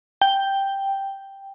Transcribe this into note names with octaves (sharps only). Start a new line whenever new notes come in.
G5